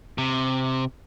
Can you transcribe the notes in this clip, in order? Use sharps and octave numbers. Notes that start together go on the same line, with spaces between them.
C3